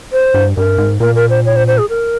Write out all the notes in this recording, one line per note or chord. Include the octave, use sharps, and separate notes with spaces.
C5
G2
G2 A#4
G#2
A#2 A#4
A#4
C5
C#5
C5
C5
G#4
A#4